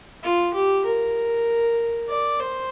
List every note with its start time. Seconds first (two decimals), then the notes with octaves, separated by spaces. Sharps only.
0.23 F4
0.54 G4
0.86 A#4
2.09 D5
2.40 C5